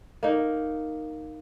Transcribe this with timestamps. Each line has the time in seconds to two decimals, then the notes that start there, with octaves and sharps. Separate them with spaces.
0.23 A#3 D#4